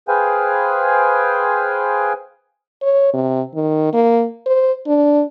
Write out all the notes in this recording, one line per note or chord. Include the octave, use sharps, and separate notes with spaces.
G#4 B4 C5 F5 G5 G#5
C#5
C3
D#3
A#3
C5
D4